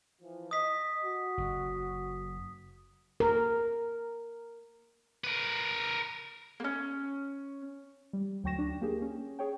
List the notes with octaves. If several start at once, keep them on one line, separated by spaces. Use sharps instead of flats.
E3 F3
D#5 D#6 B6
F#4
F#1
A#4
A#4 B4
A#3 C#4
G3
D2 F#3 G5 C#6 A#6 E7
D4
A#3 G4 G#4
C#4
G#4 C#5 G5